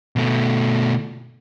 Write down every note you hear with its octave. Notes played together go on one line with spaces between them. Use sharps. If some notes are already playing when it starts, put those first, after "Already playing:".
B2 A3